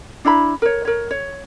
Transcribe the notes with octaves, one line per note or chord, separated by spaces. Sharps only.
D4 E4 A#5 B5
A#4 C#5
A#4 C#5
C#5